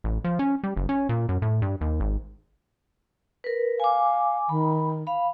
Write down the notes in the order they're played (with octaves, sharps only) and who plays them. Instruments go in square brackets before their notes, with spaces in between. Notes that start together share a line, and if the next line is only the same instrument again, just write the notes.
[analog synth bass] A1
F3
C#4
G3
F#1
C#4
A#2
F#2
A2
G2
D#2
G#1
[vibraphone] A#4 B4
[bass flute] F5 [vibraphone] G#5 D6
[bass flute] D#3 [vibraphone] B5
[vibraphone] F5 B5